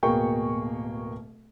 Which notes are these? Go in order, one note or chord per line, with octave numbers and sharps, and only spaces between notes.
D1 B2 A#3 G#4 G5 C#6